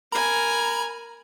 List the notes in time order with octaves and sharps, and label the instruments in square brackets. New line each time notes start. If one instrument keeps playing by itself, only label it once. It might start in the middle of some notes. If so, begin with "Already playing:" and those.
[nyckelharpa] A#4 G#5 [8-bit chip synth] A#5 B5